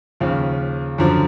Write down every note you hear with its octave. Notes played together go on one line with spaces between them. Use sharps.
D#2 C#3 F3
F#2 D3 F3